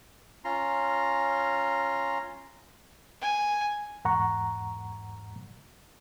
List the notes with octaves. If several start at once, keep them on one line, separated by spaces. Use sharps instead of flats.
C#4 F4 A#5 C6
G#5
E2 G#2 F#5 A#5 C#6